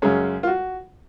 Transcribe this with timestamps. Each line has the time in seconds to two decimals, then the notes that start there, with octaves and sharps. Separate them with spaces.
0.02 F#2 C#3 G#3 C#4
0.43 F4
0.47 F#4